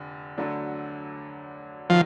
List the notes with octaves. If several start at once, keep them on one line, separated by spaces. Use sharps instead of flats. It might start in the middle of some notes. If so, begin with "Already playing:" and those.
Already playing: F1 D3
D2 D3 F#3 A3 D4
D#3 F3 F#3